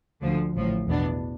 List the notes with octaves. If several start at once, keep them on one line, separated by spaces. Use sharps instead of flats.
D2 D3 F3
A1 A2 F3
E2 B2 B3 D4